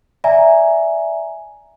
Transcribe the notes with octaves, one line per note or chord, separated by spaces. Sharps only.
D5 E5 G#5 A#5